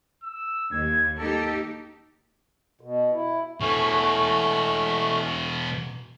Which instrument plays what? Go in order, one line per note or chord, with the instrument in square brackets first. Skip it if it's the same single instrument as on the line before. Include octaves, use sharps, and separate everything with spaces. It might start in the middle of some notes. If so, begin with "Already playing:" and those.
[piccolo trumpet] E6
[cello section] D#2 [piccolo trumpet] G#6
[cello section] A#3 D#4 G4 [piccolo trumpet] A4
[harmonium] B2
E4
[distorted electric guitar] B2 E3 [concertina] A3 C#4 F#4